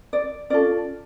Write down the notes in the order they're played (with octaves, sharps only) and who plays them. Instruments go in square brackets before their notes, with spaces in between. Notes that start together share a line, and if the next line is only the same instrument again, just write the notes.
[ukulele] D5
C#4 F4 A4 D5